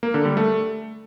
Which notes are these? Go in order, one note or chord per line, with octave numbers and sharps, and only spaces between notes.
A#3
D3
G3
A3